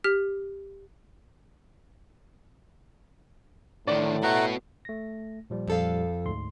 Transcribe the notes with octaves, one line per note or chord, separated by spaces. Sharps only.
G4 F6 B6
A2 D3 D#3 D5
A3 B3 F#4 F#5 A#5
A3 A#6
A#2 F3 G3
F2 A4 F5
D2 G#2 C6